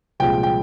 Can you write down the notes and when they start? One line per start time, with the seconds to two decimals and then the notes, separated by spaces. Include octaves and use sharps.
0.20 C2 A#2 F3 G#3 G5
0.43 G5